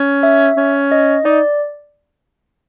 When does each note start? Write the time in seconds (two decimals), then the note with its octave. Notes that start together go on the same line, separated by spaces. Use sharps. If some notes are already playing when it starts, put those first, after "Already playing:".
Already playing: C#4
0.23 E5
0.57 C#4
0.91 D#5
1.25 D#4 D5